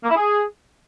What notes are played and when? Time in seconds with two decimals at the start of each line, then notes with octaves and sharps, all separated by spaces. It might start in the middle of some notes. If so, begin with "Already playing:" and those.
0.04 A#3
0.10 E4
0.16 G#4